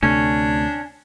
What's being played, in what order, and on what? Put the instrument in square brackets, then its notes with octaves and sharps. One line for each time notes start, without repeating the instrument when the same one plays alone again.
[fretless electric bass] D2 C3 A3 [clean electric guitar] C#4 [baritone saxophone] D4